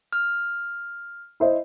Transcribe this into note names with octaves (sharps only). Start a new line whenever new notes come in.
F6
E4 C5 D#5